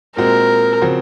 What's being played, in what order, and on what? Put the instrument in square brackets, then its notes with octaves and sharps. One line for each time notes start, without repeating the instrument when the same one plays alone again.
[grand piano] A#2 G#3 C4 F#4 [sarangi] A#4
[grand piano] C#3 F3 C4 F#4